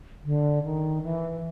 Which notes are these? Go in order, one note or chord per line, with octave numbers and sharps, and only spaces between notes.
D3
D#3
E3